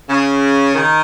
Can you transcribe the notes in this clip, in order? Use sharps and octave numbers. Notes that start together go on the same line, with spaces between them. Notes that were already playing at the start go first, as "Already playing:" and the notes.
C#3
D#3